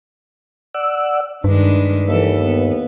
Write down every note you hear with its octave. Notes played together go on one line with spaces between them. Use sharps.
D5 F#5 E6
G2 D#3 G#3 D4 B4
D#2 E3 A4
B3